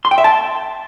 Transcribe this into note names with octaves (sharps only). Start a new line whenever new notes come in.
C6
G5
E5
A5